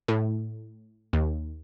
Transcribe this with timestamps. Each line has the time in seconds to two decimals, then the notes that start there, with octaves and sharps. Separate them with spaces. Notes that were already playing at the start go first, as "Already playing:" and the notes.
0.08 A2
1.13 D#2